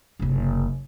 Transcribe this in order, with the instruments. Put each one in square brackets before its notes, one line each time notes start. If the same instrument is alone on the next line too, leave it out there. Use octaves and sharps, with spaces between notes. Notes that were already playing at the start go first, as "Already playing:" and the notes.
[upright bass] F#1 C3